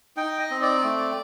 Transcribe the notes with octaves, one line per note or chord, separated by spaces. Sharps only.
D#4 G5
D#5
C4
D5
A3